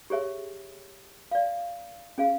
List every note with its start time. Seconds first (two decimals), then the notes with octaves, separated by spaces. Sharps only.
0.10 G4 G#4 C#5 E5
1.31 D5 F5
2.18 C#4 G#4 F5